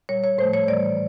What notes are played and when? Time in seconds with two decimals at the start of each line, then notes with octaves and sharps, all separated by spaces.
0.09 A#2 G3 C#5
0.24 C#5
0.38 A2 F3 A3 C5
0.53 C#5
0.68 A2 E3 G3 D5